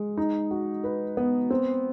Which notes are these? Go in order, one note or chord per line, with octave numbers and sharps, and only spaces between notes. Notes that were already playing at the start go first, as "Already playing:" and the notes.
Already playing: G#3
D#4
F#4
B4
B3
C4